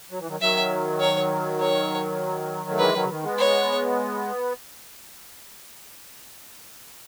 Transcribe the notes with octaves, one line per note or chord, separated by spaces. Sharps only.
F#3
E3
D#3 F#3
D#3 F#3 E5
C#5
C#5
A3
E3 G#3 B4
D#3 F#3
C#3
D#3
G#3 B3
C#5